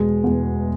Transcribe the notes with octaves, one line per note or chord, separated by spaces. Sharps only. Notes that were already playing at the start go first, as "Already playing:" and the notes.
Already playing: E1 G#3
E2 B2